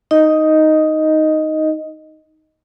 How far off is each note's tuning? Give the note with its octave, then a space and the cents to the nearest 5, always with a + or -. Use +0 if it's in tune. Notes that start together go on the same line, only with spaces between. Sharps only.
D#4 +5 D#5 +0